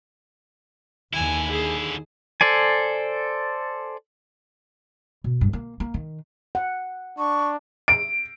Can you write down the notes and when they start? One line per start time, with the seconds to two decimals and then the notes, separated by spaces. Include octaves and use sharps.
1.13 D#2 D3 E4 G#5
1.51 G#4
2.41 A4 C5 D5 G#5
5.24 B2
5.41 G2
5.53 A#3
5.80 A#3
5.94 D#3
6.55 F#5
7.18 D4 C#6
7.88 D7